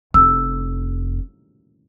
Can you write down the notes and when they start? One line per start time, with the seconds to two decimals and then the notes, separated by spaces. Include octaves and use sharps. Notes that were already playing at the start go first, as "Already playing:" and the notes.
0.14 F1 E6